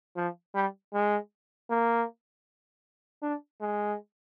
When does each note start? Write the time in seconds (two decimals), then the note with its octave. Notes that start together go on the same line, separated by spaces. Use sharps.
0.16 F3
0.55 G3
0.94 G#3
1.70 A#3
3.22 D4
3.61 G#3